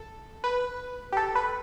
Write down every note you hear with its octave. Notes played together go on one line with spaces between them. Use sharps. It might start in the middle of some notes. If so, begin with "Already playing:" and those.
Already playing: A4
B4
G4
A4
B4